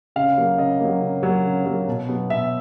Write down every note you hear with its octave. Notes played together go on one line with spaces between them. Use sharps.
C#3 F5
F#3 A#3
C#3 D#5
F#3 A#3
C#3
F#3 A#3
C#3
F#3 A#3
B2
F#3 B3
B2 E5